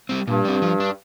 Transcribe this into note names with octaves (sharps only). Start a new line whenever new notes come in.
G3 C4
G2 A#2
G3 C4
F3
D4